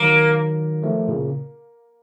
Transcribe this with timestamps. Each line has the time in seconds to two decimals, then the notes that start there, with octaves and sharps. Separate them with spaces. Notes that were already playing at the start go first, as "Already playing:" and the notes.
Already playing: D#3 F#3 A#3
0.83 F3 A3
1.08 A#2 C#3